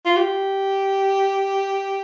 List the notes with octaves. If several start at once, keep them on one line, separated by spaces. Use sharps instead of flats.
F4
G4